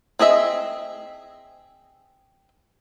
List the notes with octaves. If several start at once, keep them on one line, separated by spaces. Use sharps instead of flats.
C4 G#4 D#5 E5